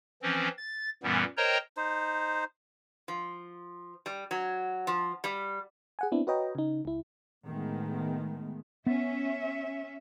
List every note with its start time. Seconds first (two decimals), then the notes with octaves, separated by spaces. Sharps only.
0.22 E3 F3 C4 C#4
0.58 A6
1.03 F#2 A#2 E3 G3 B3
1.37 A#4 C5 C#5 D#5 G5 A#5
1.77 D#4 C5
3.08 F3
4.06 G3
4.31 F#3
4.87 F3
5.24 G3
5.99 G#4 F#5 G#5
6.12 B3 C4 D4 E4
6.27 F#4 B4 C#5 D#5 G5 A#5
6.55 C#3 D#4
6.85 C#2 E4
7.46 A2 D#3 G#3 A3 B3
8.86 B3 C#4 E5